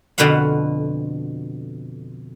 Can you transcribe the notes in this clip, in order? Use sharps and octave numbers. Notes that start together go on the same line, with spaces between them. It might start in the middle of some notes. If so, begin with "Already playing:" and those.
F2 B2 D3 B4 F5 F#5